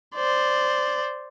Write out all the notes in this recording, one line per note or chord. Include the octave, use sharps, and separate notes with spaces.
C5 D5